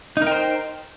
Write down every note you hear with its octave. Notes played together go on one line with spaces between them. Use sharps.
D#4 A#4 C5 G5